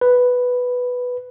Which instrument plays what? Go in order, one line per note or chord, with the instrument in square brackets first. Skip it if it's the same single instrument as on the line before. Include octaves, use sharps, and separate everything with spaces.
[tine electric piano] B4